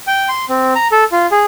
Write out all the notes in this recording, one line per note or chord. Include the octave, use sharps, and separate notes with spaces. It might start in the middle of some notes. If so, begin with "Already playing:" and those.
G5
C6
C4
A#5
A4
F4
G#4